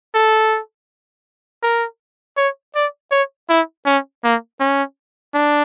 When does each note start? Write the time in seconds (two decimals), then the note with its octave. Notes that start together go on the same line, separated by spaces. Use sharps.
0.14 A4
1.63 A#4
2.37 C#5
2.75 D5
3.11 C#5
3.49 E4
3.86 C#4
4.24 A#3
4.60 C#4
5.34 D4